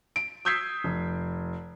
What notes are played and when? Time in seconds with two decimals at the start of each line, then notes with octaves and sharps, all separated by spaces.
0.16 D7
0.45 D#6 E6 G6 G#6 B6 C7
0.84 F1